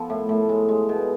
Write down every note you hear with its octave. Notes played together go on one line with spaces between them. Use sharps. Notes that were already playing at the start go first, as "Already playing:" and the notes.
Already playing: F3 B3 A4
A2
A2
G#3
G#3
B2